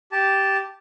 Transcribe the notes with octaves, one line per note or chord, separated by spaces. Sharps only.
G4 A5